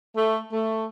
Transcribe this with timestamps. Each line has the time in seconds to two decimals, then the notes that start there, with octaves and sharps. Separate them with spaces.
0.15 A3
0.51 A3